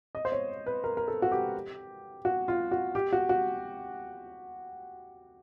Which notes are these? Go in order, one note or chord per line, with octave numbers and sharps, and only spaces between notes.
D#5
C5
C#5
B4
A#4
A#4
A4
F#4
G4
F#4
F4
F#4
G4
F#4
F#4